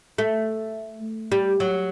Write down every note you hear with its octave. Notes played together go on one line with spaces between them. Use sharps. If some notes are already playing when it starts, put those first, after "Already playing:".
A3
G3
F#3